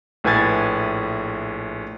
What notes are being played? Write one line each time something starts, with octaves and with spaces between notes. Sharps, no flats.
A#1 A2 B4 G#5 G#6 A6